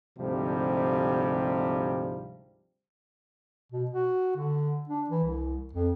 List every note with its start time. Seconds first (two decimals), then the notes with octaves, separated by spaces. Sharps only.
0.18 D2 G#2 C3 F3 G3
3.72 B2
3.91 F#4
4.36 D3
4.89 D4
5.09 E3
5.24 C2
5.73 F2